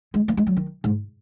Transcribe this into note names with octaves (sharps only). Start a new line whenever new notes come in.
G#3
A#3
G#3
F#3
D#3
G#2